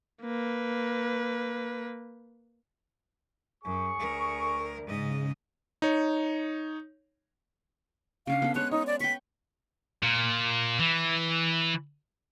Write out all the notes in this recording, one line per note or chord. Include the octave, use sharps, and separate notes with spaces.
A#3 B4
F#2 G#4 C#6
D2 A#4
G#2 C#3 D#5
D#4 C#5
C#3 C#4 D4 F5
B3 A4
G#3 C#5 F#6
D#4 C#5
D5
G5 C#6 B6
A#2
E3